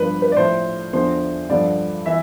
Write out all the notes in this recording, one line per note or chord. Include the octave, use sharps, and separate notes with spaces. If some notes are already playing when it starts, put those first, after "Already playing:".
Already playing: G2 F3 B4
B4
D5
A2 F3 C5
E2 D3 F3 C5
G2 D3 F3 D5
E3 E5